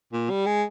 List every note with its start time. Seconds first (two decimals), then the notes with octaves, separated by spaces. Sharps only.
0.13 A#2
0.30 G3
0.46 G#3